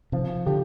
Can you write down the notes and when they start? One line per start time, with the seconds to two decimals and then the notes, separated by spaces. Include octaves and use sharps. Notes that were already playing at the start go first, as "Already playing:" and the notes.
0.12 C3 F3
0.46 D3 G4